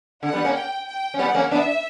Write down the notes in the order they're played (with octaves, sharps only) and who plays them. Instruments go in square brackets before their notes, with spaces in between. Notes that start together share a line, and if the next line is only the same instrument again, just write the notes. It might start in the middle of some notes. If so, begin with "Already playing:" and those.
[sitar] D3 [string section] F#5
[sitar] G3 B3
A#3 C#4
[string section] G5
G5
[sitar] C#4
[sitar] G3 B3 [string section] F#5
[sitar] A#3 C#4
[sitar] B3 D4 [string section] E5